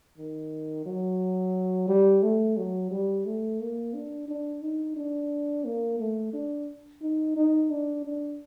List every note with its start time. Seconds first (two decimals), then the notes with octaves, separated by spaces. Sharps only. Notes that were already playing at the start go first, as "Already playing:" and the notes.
0.18 D#3
0.86 F#3
1.88 G3
2.23 A3
2.57 F#3
2.91 G3
3.26 A3
3.60 A#3
3.94 D4
4.28 D4
4.62 D#4
4.96 D4
5.65 A#3
5.99 A3
6.33 D4
7.02 D#4
7.36 D#4
7.70 D4
8.05 D4